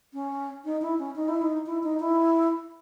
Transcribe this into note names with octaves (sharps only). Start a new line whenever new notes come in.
C#4
D#4
E4
C#4
D#4
E4
D#4
E4
D#4
E4